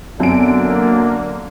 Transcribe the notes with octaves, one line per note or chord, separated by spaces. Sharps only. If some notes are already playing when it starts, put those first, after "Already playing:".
F#2 D3 B3 C4 D7
A#3